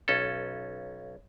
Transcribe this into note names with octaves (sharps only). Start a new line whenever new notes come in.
B1 C#4 A4